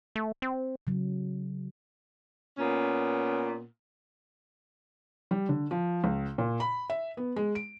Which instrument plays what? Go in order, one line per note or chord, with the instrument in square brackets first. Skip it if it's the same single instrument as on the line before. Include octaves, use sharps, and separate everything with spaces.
[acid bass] A3
C4
[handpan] C#3 F#3
[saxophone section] A#2 B3 C#4
[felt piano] G3
D3
F3
C#2
A#2
B5
E5
B3
G#3
D7